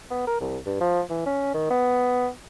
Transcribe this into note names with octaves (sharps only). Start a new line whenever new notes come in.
B3
A#4
C2
G2
F3
E3
C#4
D#3
B3